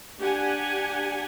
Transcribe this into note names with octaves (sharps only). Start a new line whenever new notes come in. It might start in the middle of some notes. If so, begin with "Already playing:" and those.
D4 G4 F#5 G#5